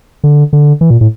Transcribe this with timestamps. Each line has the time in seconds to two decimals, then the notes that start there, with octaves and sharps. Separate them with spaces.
0.24 D3
0.53 D3
0.81 E3
0.90 A#2
1.01 A2